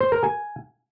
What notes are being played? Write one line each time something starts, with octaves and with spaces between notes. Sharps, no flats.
C5
A#4
G#5